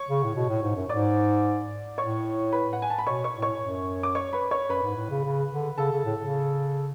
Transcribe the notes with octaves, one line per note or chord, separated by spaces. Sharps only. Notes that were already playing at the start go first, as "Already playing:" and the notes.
Already playing: C#5 C#6
C#3
A2
B2
A2
G#2
F#2
G#2 D5 D6
A2 C#5 C#6
B4 B5
F#5
G#5
A5
B5
B2 C#5 C#6
C#5 C#6
A2
C#5 C#6
F#2
D6
C#5 C#6
B4 B5
C#5 C#6
F#2 B4 B5
G#2
A2
C#3
C#3
D3
C#3 A4 A5
C#3
A2
C#3